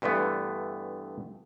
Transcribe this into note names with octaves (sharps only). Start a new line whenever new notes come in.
G2 D3 E3 A3 B3